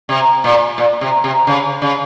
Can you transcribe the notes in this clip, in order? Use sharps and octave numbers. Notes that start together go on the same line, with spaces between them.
C3
A#2
A#2
C3
C3
C#3
C#3